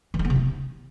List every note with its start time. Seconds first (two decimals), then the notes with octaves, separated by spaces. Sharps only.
0.14 E3
0.19 G3
0.25 B3
0.30 C3
0.35 E4